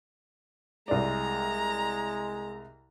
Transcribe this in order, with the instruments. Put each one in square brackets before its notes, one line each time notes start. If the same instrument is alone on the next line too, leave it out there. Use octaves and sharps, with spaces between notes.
[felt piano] C2 D5 [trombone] G#3 [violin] A#5